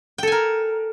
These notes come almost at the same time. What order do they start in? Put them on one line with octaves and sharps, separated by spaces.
G5 A4 G#5 A#4